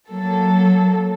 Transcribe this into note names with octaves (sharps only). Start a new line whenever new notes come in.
F#3 A#3 A4